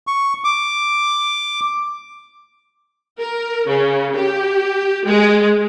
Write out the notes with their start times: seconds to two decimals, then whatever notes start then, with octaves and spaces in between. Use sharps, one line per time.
0.07 C#6
0.44 D6
3.20 A#4
3.68 C#3
4.16 G4
5.06 G#3